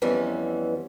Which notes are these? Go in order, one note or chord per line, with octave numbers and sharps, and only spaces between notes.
F2 E3 G3 B3 C#4